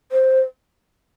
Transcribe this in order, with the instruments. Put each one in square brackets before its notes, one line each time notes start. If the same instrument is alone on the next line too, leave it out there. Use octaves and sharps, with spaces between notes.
[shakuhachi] C5